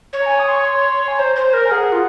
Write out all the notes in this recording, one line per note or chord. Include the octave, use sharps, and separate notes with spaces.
C#5
A#5
G#5
D#6
C6
C#6
C6
G#5
C5 A#5
C5
A#4
G#5
G#4 F#5
F4